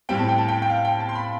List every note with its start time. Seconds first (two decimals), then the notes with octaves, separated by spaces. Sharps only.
0.09 A2 G3 C4 G5
0.19 A5
0.28 G5
0.38 A5
0.48 G5
0.62 G5
0.70 F5
0.85 G5
1.00 A5
1.09 C6
1.15 B5